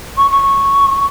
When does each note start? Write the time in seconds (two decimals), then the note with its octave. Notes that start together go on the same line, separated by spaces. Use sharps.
0.17 C#6
0.31 C#6